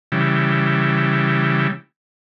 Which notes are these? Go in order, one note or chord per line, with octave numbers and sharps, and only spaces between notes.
C#3 E3 G3